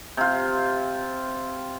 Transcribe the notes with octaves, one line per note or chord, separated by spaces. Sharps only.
C3 F4